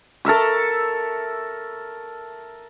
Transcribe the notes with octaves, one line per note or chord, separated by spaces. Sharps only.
A4 A#4 E5 C#6